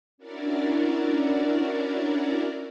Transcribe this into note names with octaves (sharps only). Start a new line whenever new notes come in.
C#4 D4 E4 F#4 A#4 D5